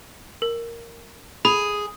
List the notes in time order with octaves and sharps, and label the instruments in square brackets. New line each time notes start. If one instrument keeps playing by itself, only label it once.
[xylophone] A#4
[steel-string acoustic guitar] G#4 [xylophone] B5